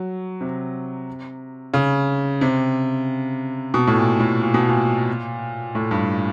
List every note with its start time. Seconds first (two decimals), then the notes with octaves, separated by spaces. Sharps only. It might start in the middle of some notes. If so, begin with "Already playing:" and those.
Already playing: F#3
0.41 C3
1.74 C#3
2.41 C3
3.74 B2
3.87 A2
3.97 A#2
4.20 A2
4.41 A#2
4.54 B2
4.68 A#2
5.75 A2
5.91 G2